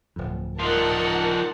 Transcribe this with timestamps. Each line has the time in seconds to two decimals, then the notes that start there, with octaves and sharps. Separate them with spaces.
0.16 D1 F2
0.59 F3 D#4 A#4 F#5 A5